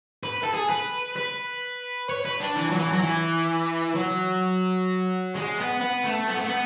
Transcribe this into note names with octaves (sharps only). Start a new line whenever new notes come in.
B4
A4
G#4
B4
B4
C#5
B4
D4
E3
F#3
E3
F#3
E3
F#3
G#3
B3
B3
A3
B3
A3
B3